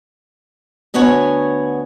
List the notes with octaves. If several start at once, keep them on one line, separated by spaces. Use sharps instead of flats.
D2 B3 C#5 F#5 G#5